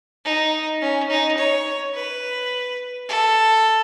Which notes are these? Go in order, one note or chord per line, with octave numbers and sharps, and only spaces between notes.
D#4
C#4
D#4
C#5
B4
A4